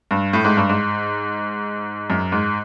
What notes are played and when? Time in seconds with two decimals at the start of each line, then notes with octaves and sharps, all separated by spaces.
0.11 G2
0.33 A2
0.45 G#2
0.57 G2
0.69 G#2
2.10 F#2
2.32 G#2